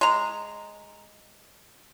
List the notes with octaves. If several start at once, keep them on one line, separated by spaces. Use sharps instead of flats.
G#3 A#5